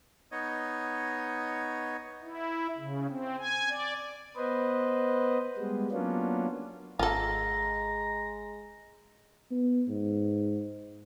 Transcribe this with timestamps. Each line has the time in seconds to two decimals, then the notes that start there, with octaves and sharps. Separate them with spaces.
0.32 B3 D#4 C#5 D#5
2.23 E4
2.78 C#3
3.09 C4
3.39 G#5
3.69 D5
4.37 B3 B4 C5 D#5
5.57 G3 G#3 B3
5.91 F#3 A#3 B3 C#4 D4 F4
6.99 G#1 G#3 F4 A4 A#5
9.51 B3
9.88 G#2